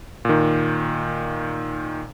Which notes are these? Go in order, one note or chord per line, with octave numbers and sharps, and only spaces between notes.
A#2 D#3